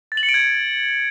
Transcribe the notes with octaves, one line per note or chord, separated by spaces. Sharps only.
A6
F#7
C#7
D7
G#6